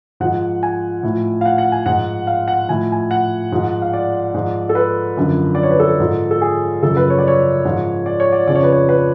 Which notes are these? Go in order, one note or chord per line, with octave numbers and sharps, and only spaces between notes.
G#2 F3 F#5
G#5
A2 F3
F5
F#5
F#5
G#5
G#2 F3 F#5
F5
F#5
A2 F3 G#5
G#5
F#5
G#2 F3
F5
D5
G#2 F3
A4
B4
F#2 D3 F3
D5
C#5
B4
A4
G#2 F3
A4
G#4
F#2 C#3 F3 A4
B4
C#5
D5
C#5
G#2 F3
D5
C#5
D5
F2 C#3 F3 D5
C#5
B4
C#5
B4